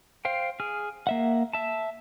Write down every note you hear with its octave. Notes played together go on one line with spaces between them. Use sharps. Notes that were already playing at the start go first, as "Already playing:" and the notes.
C5 F5 G5
G#4 F6
A#3 E5 F#5
E5 A5